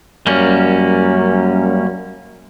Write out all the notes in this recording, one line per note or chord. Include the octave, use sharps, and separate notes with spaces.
F#2 G3 A#3 C#4